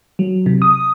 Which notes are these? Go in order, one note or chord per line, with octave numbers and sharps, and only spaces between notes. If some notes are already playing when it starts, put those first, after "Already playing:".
F#3
C3
D#6